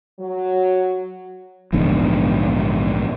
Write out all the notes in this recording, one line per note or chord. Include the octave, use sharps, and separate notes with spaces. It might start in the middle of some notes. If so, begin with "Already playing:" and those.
F#3
A#1 E2 G#2 D3